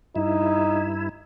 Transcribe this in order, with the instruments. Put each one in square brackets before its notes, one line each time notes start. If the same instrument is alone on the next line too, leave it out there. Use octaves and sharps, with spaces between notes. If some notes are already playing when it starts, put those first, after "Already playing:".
[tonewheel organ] G2 E4 [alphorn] D#4